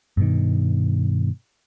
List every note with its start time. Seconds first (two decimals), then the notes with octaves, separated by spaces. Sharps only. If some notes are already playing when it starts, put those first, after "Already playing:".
0.17 G2 B2 D#3